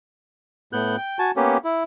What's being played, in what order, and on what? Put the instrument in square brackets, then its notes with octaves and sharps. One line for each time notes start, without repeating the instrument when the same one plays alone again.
[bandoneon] A2 B3 F#6 G6
G5
F#4 G#5 A5
A#3 B3 C#4 G4
E4